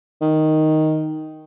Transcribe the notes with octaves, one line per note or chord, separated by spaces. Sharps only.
D#3